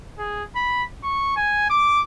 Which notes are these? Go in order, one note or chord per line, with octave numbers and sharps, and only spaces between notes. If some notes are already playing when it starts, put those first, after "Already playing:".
G#4
B5
C#6
G#5
D6